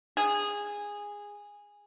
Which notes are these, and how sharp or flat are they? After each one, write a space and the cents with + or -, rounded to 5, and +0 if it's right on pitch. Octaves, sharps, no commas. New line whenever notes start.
G#4 -15